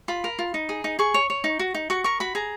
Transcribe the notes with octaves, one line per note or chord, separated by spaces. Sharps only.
F4 B5
A#4
F4
D#4
G#4
D#4
G#4 C#6
C#5
C#5
D#4
F#4
D#4
F#4 C#6
A#4 C#6
F#4 B5
G#4 A#5